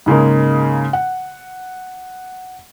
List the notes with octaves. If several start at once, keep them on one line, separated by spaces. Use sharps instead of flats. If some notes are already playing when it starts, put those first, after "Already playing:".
G#2 C#3 G#3 A#3
F#5